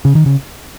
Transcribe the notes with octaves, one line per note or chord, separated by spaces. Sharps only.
C#3
D#3
C#3